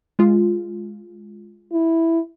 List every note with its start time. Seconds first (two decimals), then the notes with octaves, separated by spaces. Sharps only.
0.19 G#3 F4
1.73 E4